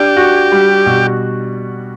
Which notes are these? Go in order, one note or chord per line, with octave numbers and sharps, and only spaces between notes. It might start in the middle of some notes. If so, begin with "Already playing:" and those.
Already playing: D4 G4
F#4
G3
B2